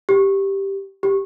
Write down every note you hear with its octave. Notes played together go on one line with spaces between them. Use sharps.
G4
G4